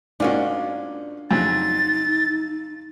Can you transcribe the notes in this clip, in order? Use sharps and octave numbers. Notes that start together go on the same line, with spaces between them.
G#2 A#3 C#4 D4 F4 F#4
F2 C#3 F#3 D#4 A6